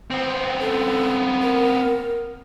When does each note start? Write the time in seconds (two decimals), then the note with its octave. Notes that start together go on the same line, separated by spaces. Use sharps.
0.11 B3 C4
0.61 A4
1.42 A#4